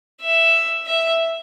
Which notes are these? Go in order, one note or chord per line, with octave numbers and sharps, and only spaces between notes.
E5
E5